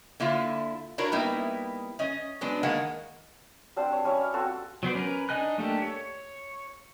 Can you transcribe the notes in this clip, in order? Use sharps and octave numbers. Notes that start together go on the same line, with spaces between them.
D3 A#3 E4 F4
D4 E4 F#4 A#4 C#5 D5
G3 A#3 B3 D#4 E4
C#4 D#5
F#3 G#3 B3 D4
D#3 G#3 A#3 F#5
G3 C4 D4 C5
C#5
G3 C#4 E4 C#5
F5
C4 F4 F#4 A4
F#3 B3 C5 D5
C#4 A#4 B4
D4 D#4 D#5 G#5 F#6
A3 A#3 D4 G4 A4
C#5